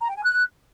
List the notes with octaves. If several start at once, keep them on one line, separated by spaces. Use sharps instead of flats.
A#5
G5
G#5
F#6